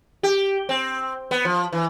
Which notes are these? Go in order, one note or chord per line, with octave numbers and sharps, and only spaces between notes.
G4
C4
B3
F3
E3